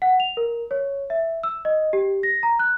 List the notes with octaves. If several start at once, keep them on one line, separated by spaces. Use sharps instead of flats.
F#5
F7
A#4
C#5
E5
E6
D#5
G4
A#6
A#5
F#6